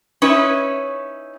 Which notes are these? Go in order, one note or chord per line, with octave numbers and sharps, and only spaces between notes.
C#4 D#4 E4 B4 C#5